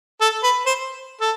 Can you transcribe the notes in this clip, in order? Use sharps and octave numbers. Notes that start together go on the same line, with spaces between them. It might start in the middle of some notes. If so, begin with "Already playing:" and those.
A4
B4
C5
A4